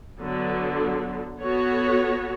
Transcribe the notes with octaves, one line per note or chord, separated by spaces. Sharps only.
D3 F#3 B3
B3 F#4 A4 C#5